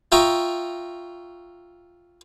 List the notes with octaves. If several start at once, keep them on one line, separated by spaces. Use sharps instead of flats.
F4 E5 G5 A#5 C#6 D#6